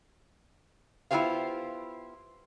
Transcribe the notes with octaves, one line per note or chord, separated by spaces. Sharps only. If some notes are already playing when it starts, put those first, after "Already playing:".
B3 E4 F4 G4 C5 F5